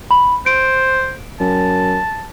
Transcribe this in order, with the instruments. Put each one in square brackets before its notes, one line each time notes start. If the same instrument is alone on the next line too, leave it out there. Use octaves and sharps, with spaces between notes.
[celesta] B5
[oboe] C5 [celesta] D7
[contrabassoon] F#2 [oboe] A5